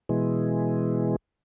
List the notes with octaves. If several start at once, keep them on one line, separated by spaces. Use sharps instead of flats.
B2 E3 G#3